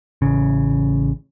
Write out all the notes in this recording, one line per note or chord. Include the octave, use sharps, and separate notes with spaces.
A1 C#3